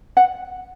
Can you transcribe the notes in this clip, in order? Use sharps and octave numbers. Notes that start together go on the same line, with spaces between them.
F#5